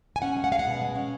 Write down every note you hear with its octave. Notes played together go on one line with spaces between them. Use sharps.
G#5
C#4 F#5
G#3
F#5
G#3 F5
F#5
B2
G#3
C#4